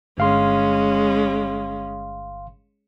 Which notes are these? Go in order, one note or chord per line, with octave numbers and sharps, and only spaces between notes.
G1 G#3 C#4 F5 C6